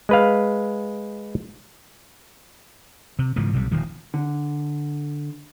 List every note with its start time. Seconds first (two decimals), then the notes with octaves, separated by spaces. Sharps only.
0.09 G#3 B4 F5
3.19 C3
3.36 G#2 C#3 E3 F3
3.53 B1 C3 F3 G3
3.71 D#1 D#3 F3
4.14 D3